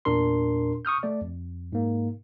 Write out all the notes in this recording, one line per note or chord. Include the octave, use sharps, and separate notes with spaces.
E2 A#2 D4 A#4 C6
C#6 D#6 F6 G6
A3 D5
F2
G#2 A#3